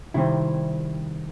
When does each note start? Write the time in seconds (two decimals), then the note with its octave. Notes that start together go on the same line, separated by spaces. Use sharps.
0.14 C3 D#3 G3 C4 E4